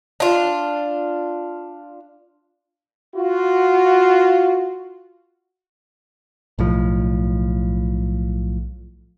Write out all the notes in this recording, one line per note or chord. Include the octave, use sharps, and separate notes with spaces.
D4 F4
F4 F#4
B1 A2 F3